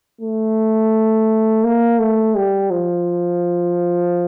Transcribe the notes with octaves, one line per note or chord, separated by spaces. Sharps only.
A3
A#3
A3
G3
F3